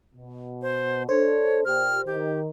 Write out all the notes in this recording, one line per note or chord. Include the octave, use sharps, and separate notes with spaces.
B2
C5
D4 A4 C5 C#5
A#2 G4 F6
D#3 G4